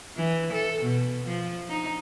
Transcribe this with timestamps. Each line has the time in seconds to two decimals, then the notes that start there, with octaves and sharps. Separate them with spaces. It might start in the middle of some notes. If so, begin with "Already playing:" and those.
0.16 E3
0.53 A4
0.83 B2
1.27 F3
1.69 D#4